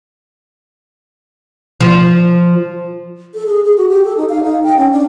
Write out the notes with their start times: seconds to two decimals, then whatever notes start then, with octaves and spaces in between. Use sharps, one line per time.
1.81 F3
3.34 A4
3.46 G#4
3.65 G#4
3.78 F#4
3.89 G4
4.05 A4
4.17 D#4
4.29 F5
4.43 D#4
4.64 G5
4.77 C#4
4.92 D4